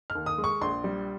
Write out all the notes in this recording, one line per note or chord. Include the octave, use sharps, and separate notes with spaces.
F6
D#2
D#6
G#3
C#6
A#1 C6
G3